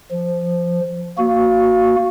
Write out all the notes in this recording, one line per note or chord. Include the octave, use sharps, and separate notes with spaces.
F3
A#3 F#4